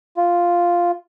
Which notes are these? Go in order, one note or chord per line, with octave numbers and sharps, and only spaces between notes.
F4